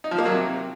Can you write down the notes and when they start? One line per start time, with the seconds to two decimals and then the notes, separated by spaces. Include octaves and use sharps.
0.04 D#4
0.11 F3
0.18 A#3
0.26 F#3
0.33 C3